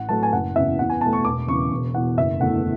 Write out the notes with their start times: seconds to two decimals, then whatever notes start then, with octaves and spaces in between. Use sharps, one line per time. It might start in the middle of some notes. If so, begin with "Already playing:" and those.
Already playing: A1 F#5
0.09 A2 F#3 A3 A5
0.23 G#5
0.32 F#1 F#5
0.55 E2 C#3 E5
0.79 E2 F#5
0.89 G#5
1.01 B2 A5
1.06 A3
1.13 C#6
1.24 E1 D6
1.48 E2 C#3 E3 C#6
1.72 E1
1.94 E2 B2 F#5
2.17 F#1 E5
2.40 E2 D3 A3 F#5